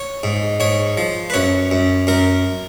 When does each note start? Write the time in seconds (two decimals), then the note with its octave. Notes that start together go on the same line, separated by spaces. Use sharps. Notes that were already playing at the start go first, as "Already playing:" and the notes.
Already playing: C#5
0.23 G#2
0.60 G#2 C#5
0.97 F3
1.30 B4
1.34 F#2 C#5
1.71 F#2
2.07 F#2 A#4